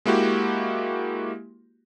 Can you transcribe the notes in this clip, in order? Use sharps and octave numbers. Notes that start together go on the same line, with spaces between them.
G#3 A#3 E4 F#4 G4